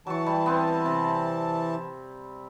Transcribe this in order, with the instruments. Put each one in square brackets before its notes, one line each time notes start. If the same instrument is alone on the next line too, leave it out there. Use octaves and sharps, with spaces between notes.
[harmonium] E3 A5 [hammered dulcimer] F#3 C#6
[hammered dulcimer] G3
B3 C4
C3